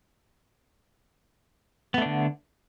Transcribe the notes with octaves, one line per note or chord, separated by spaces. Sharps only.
D3 A3 B3 D4